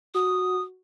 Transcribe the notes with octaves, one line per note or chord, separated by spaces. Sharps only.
F#4 D#6